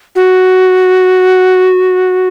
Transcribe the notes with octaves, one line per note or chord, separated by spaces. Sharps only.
F#4